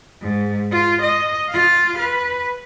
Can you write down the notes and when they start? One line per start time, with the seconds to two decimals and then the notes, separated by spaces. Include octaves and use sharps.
0.22 G#2
0.72 F4
1.02 D#5
1.49 F4 F5
1.98 B4